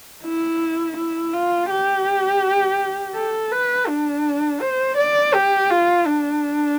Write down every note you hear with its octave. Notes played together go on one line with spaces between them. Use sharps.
E4
E4
F4
G4
A4
B4
D4
C5
D5
G4
F4
D4